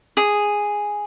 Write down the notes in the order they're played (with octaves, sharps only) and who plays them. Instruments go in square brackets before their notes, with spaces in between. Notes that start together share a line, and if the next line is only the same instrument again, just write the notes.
[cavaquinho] G#4